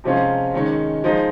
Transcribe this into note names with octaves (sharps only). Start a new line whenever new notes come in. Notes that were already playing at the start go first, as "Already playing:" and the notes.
C3 F3 G#3 C#4 F4
D#3 G#3 C#4
F3 G#3 D#4